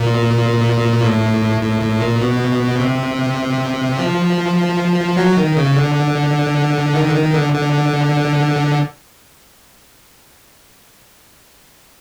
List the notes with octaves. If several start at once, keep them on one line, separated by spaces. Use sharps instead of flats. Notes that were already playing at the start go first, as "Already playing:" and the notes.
Already playing: A#2
A2
A2
A2
A#2
B2
C3
F3
F#3
D#3
C#3
D3
D#3
D3
D#3
D3
D3